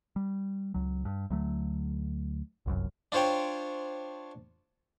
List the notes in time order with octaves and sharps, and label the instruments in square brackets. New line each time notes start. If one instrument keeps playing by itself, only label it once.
[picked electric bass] G3
C#2 F#3
G2
D2 F#3 A3
G1 C2 F#2
[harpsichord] D4 F4 C5 C#5 G5